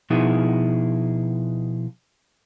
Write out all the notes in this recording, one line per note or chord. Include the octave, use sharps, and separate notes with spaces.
B2 F3 B3 D#4 E4 G#4